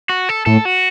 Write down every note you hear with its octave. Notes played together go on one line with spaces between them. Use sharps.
F#4
A4
A2 A4
F#4